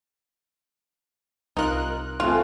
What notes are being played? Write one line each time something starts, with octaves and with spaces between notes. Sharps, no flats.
C2 D#4 F4 A#4 F#6
F2 F3 G#3 A3 C4 F4 F#4